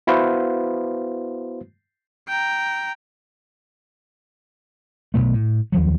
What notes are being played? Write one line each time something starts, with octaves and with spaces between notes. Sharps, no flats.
B3 E4 F#4 B4 C5 F5
G5 A#5
B1 F2 B2 A3
A2
D#2 F3 F#3